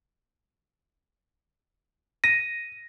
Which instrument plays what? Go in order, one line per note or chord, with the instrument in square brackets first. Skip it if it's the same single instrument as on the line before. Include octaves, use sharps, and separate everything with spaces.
[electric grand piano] A#6 [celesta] D#7